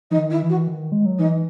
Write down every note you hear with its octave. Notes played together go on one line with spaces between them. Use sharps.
E3 D#4
D#3
E4
E3
F#4
D#3
G#3
F#3
E3 D#4